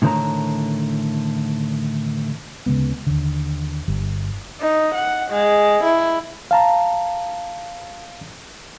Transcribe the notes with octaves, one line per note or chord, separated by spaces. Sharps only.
A2 D3 D#3 C5 C#5 A#5
D2 C#3 G#3 B3
D#2 D3
G1 G3
D#4
F#5
G#3
E4
F5 A5 A#5